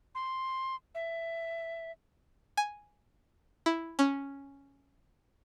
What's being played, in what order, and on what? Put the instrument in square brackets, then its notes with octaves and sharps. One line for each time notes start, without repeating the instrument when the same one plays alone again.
[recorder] C6
E5
[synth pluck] G#5
E4
C#4